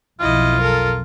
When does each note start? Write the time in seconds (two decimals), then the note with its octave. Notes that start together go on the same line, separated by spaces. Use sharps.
0.20 B1 F2 E4 F4 D#5
0.61 A4 A#4